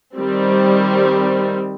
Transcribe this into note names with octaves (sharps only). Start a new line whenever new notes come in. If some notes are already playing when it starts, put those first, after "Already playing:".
D#3 G3 C4